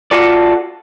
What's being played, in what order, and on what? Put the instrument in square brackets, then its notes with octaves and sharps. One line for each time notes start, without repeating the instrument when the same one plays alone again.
[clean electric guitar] F4 F#4 A4 D5